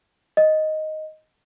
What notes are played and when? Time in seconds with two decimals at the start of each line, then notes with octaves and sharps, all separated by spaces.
0.37 D#5